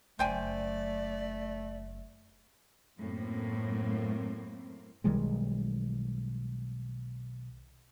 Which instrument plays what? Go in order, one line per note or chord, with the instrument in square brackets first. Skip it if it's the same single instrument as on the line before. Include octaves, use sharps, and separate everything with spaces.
[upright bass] F#1 F#2 [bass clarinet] A3 [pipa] C5 G5 G#5 [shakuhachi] D5
[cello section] F#2 A2 A#3 C4
[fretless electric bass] B1 D#3 G3 G#3